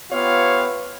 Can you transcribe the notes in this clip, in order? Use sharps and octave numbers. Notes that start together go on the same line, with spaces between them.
B3 F4 G4 C#5 E5 F5